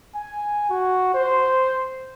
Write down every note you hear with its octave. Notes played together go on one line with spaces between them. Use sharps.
G#5
F#4
C5